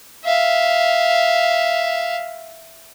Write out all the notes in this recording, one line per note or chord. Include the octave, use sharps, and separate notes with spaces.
E5 F5